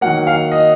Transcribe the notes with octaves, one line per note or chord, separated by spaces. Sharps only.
D#3 F#3 A#3 F#5
F5
D#5